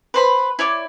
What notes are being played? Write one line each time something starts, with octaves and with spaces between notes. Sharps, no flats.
B4 C5 B5
E4 C#5 D5 D6